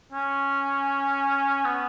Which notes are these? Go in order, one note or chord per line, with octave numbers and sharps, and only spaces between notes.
C#4
B3